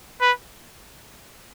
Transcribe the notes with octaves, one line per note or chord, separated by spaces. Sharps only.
B4